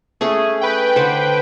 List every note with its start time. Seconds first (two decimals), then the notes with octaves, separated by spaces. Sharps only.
0.21 A3 C#4 G#4
0.61 B4 G5
0.96 D3 C5